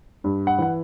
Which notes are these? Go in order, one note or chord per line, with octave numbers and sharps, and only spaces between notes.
G2
F#5
E3 F#5